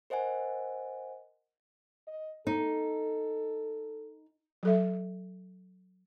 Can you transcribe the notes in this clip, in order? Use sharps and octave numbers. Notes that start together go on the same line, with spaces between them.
A#4 C5 D#5 F#5 G#5
D#5
D#4 A4
F#3 A4 E5